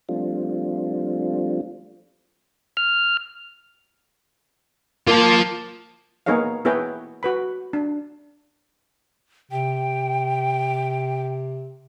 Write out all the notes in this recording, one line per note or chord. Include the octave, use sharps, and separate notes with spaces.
F3 G3 A3 C4 D4 F4
F6
A#3 F4 A5
A#3 B3 D#4 G#4 C#5 F5
B3 E4 G#4 B4 C#5 G5
F#4 B4 B5
D4
C3 G5